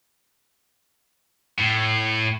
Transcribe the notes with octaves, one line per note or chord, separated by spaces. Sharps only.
A2